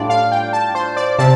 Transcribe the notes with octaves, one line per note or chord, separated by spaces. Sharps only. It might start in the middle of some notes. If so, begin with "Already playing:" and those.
Already playing: A2 G3 D4 F4 D5
F5
G5
A5
C5
D5
C3 G3 C4 A5